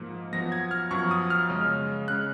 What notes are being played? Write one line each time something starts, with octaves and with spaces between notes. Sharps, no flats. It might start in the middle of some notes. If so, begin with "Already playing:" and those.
Already playing: G#2 F3 A#3
F#2 F3 B3 A#6
G#6
F6
F#2 F3 B3 C#6
D#6
F6
C#3 G#3 C#4
C#3 G#3 C#4 F#6